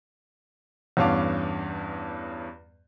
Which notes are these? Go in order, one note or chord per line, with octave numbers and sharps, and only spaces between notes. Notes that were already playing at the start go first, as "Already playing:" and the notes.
E2 G2 C#4 F5 A5 D6